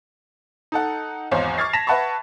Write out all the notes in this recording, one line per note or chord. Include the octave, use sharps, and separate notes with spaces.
D#4 A4 F#5
G#1 E2 C5 C#5 F5
C#6 D6 F6 G#6 A6 C7
A5 A#6 B6 E7 F7
B4 E5 F#5 A5 B5 C#6